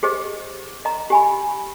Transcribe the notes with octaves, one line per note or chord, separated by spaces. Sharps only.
G4 G#4 C5 D#5
D#5 A#5
G4 G#5 B5